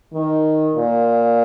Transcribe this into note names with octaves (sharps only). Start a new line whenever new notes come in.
D#3
A#2